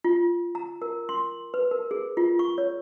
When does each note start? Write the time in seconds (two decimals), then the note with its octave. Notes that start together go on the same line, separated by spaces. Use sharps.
0.04 F4
0.55 A#5
0.82 A#4
1.09 C6
1.54 B4
1.71 A#4
1.91 G#4
2.17 F4
2.39 C#6
2.58 C#5